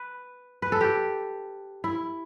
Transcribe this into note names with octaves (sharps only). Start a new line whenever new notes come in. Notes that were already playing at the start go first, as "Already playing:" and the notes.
Already playing: B4
B4
A4
G4
E4